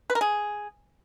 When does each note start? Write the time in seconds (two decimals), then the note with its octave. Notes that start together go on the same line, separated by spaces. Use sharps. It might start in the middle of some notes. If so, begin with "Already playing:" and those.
0.10 B4
0.15 A#4
0.21 G#4